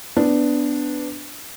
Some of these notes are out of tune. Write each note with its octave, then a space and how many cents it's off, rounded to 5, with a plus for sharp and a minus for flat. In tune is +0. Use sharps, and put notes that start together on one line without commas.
B3 +15 D4 +0